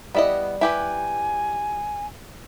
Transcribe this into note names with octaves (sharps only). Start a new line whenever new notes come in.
G3 B3 E4 D#5
E4 G4 B4 G#5